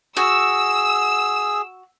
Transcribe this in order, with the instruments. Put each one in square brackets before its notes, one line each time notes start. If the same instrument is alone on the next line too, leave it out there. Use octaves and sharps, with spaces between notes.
[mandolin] F#4 [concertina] G#4 [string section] E6